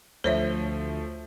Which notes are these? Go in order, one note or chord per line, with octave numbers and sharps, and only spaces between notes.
D2 F3 A3 C5 C#5 E5